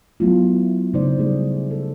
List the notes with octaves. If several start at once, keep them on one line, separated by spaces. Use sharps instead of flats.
F#3 A3 B3 E4 F4
C#3 A3 D#4 C5 D5
G3 A3 G#4
A4